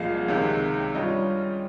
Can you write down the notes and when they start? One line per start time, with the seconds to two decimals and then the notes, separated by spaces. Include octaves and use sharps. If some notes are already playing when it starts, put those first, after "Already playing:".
Already playing: C2 A#2 F3 G#3 F5
0.28 C#2 C3 D#3 G#3
0.95 G2 G3 C#4 F4 D#5